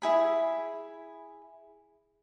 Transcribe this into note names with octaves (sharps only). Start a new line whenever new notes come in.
E4 G#4 B5